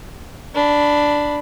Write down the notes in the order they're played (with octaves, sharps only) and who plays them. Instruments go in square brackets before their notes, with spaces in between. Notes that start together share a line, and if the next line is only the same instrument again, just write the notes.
[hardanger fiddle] D4 B5